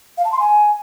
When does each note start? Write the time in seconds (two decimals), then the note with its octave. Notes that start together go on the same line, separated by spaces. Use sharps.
0.17 F5
0.25 A5
0.32 C6
0.39 G#5